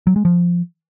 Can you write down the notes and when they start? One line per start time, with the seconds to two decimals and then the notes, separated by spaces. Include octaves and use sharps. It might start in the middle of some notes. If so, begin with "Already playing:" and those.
0.07 F#3
0.16 G#3
0.25 F3